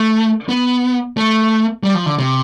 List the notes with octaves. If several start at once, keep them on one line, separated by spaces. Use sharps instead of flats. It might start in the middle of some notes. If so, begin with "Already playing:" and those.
Already playing: A3
B3
A3
G3
F3
D3
C3